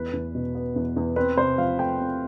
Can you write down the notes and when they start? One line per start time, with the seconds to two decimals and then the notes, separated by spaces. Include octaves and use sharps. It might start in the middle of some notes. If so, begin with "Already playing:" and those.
Already playing: E2 B4
0.13 E2
0.35 B2
0.55 B3
0.76 E2
0.96 E2
1.16 C4 B4
1.37 C3 C5
1.58 F3 F5
1.79 A3 G5
1.99 C4